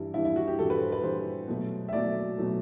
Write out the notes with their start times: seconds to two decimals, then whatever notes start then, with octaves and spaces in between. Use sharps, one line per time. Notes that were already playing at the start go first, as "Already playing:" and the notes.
Already playing: G2 E3 G3 E4
0.14 G2 E3 G3 E4
0.25 E4
0.36 F#4
0.47 G4
0.59 G2 E3 G3 A4
0.70 B4
0.81 C5
0.92 B4
1.03 G2 E3 G3 C5
1.48 B2 F#3 A3
1.89 E5
1.93 B2 F#3 A3 D5
2.38 B2 F#3 A3